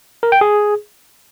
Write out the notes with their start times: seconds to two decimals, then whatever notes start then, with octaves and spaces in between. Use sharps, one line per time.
0.23 A#4
0.32 G5
0.41 G#4